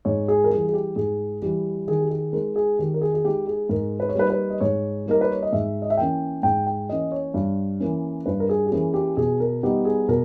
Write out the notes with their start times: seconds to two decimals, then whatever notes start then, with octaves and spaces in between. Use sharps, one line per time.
0.05 G#2 C#5
0.28 G#4
0.44 A#4
0.50 E3 G3 G#4
0.69 G#4
0.73 G4
0.96 G#2 G#4
1.42 E3 G3 G4
1.87 D#3 G#4
2.01 G4
2.11 G#4
2.33 G#3 D#4 A#4
2.56 G#4
2.79 D#3 G4
2.94 A#4
3.01 G#4
3.14 G#4
3.25 G#3 D#4 G4
3.47 G#4
3.69 G#2 A#4
4.00 B4
4.09 C#5
4.15 G3 A#3 D#4 B4
4.30 B4
4.50 D#5
4.61 G#2 C#5
5.06 G3 A#3 D#4 A#4
5.21 B4
5.32 C#5
5.43 D#5
5.52 G#2 E5
5.82 D#5
5.90 E5
5.97 E3 A#3 C#4 G5
6.43 G#2 G5
6.67 G5
6.89 E3 A#3 C#4 D#5
7.12 C#5
7.34 G2
7.80 E3 A#3 C#4
8.26 G2 B4
8.40 A#4
8.49 G#4
8.66 G4
8.72 E3 A#3 C#4 G#4
8.94 G4
9.17 B2 G#4
9.40 A#4
9.63 G3 B3 D#4 G4
9.85 G#4
10.08 B2 A#4